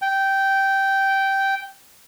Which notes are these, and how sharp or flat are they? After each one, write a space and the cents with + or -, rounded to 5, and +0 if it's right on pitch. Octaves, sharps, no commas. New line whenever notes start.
G5 -10